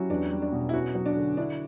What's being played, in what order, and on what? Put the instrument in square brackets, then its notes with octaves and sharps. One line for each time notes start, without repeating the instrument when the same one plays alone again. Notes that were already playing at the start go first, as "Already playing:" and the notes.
Already playing: [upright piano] F#3 [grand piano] C#4 E4 F#4 G4
[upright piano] E2 [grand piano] D4
[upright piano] G3
[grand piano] D4
[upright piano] B2
[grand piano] E4
[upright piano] C#4 [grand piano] F#4
[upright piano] F#3
[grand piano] D4
[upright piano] D3
[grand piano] D4 [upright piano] E4